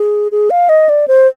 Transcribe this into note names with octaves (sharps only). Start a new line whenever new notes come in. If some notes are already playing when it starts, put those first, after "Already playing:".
Already playing: G#4
G#4
F5
D#5
D5
C5